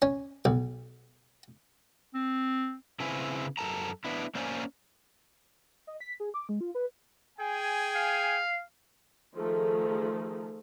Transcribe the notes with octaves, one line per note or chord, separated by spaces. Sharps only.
C#4
B1
C4
C#3 C4 C#4 E4 B4
F#2 A4 A5 A#5
B3 D4 E4
A#3 C#4 C5 D5 G#5
D#5
B6
G#4
D6
G#3
F4
B4
G#4 G5 G#5
F5
D#3 F3 A3 G#4 A4